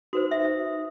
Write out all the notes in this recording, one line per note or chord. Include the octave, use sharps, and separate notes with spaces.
D#4 F#4 B4 C5
E5